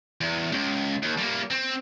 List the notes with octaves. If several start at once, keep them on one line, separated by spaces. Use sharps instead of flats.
E2
C#2
D#2
G3 A#3
C4